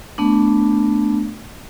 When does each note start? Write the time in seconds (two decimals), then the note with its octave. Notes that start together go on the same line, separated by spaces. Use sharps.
0.18 A3 B3 D4